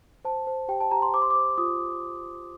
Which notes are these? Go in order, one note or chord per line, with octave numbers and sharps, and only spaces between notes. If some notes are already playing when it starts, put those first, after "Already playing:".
C5 A5
C5
G4 G5
A5
G4 A#5
C6
C5 D6
C6
D6
C5
F4 D#6